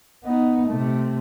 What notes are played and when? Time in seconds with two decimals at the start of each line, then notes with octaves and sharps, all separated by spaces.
0.25 B3 D#4
0.67 C3 A3